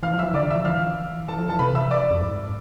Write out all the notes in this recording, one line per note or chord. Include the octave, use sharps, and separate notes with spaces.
E3 F5 F6
F3
E5 E6
E3
D3 D5 D6
E5 E6
F3
E3 F5 F6
E3 A4 A5
F3
E3 A4 A5
C3 B4 B5
E5 E6
D5 D6
F2
G#2